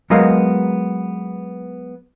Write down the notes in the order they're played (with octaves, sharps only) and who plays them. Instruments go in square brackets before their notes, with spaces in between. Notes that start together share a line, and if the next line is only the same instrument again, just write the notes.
[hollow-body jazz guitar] F#3 G#3 B3 A#4 D#5 F5